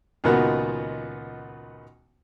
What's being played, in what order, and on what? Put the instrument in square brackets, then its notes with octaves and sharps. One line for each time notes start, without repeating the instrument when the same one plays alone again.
[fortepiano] C#2 A#2 D#3 B3 F#4